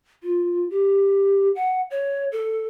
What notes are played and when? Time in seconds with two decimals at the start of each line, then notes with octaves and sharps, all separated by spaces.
0.23 F4
0.70 G4
1.55 F#5
1.91 C#5
2.32 A4